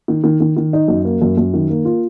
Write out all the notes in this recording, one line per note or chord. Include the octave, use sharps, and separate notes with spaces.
D#3
D#3
D#3
D#3
D#4
F#2
A#3
F#2
F#2
D#3
A#3
F4